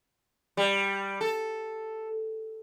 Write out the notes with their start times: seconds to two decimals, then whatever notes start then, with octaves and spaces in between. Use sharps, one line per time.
0.57 G3
1.21 A4